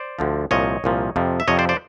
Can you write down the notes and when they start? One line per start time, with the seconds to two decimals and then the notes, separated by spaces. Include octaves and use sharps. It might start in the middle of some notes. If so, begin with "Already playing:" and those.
Already playing: C5 D5
0.19 D2 D3 F3
0.51 C2 A#2 F3 C#5 D#5
0.84 C2 A#2 F3
1.16 F2 C3 F3
1.40 E5
1.48 F2 C3 F3 C#5 D#5
1.59 C5 D5
1.69 C5 D5